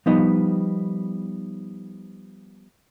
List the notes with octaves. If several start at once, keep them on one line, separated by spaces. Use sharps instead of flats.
F3 G3 B3 D#4 D#5